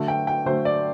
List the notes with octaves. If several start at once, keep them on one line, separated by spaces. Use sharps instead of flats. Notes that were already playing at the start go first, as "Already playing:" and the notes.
Already playing: D3 F#3 A3
G5
G5
D3 F#3 A3 C5
D5